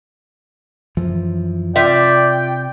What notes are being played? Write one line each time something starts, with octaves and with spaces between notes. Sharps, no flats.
F#2 E3 F3
C3 F4 D5 E5 G5